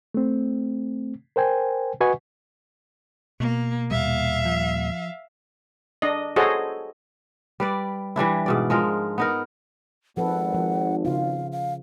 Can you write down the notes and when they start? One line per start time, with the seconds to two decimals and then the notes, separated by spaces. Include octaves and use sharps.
0.14 A3 C4
1.36 A#4 C5 G5 G#5
2.01 F#4 B4 D#5 F#5 G#5 C#6
3.40 B2 A#3
3.91 D#2 A#2 G3 E5 F5
4.45 F3
6.02 D4 D#5
6.36 F#4 G#4 A4 C5 C#5 D#5
7.60 G3 B4 D5
8.16 E3 G3 D4 E4
8.46 G#2 B2 D5
8.70 F3 G#3 A#4
9.18 B3 D#4 A#4
10.17 G#1 F3 A4 B4 F#5
10.54 F3
11.05 C#3 F4 F5
11.52 F5